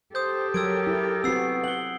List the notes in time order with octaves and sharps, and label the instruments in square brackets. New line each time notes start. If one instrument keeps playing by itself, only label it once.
[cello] G4 A4 [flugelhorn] C5 [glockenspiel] D#6 G6
[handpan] F#3 [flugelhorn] A#4 [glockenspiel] E6 G#6 D7
[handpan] E4
[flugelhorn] B3 [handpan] C4 F#4 [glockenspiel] E6 C7
[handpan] F#5 [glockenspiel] F#7 G7